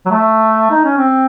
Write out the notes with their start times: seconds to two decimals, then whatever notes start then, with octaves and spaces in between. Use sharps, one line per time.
0.06 F#3
0.10 A3
0.71 D#4
0.84 C#4
0.97 C4